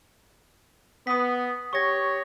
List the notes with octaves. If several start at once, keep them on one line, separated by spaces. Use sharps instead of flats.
B3 D#6 B6
G4 C#5 C#6 A#6